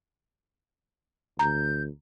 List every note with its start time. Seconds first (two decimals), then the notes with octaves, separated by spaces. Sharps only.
1.39 D2 A#5 G6